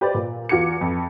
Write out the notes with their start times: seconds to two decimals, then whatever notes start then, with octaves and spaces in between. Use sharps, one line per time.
0.01 G4 B4 C5 D5
0.15 A#2
0.49 E2 F4 F#4 D6 G#6 C#7
0.81 F2